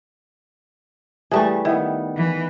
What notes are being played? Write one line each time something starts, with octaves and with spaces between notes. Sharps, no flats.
E3 G3 A3 G#4 A5 C#6
D#3 B3 E4
E3